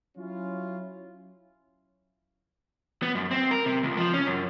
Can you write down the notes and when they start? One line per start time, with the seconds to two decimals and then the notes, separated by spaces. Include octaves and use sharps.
0.17 F#3 C#4 E4 F4
3.03 B3
3.15 F#2
3.31 C4
3.51 A#4
3.66 C3
3.83 C#2
3.97 F3
4.13 C#4
4.27 F#2